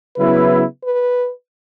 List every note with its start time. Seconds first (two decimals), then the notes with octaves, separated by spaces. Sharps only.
0.16 C#3 F#3 B3 E4 B4
0.84 B4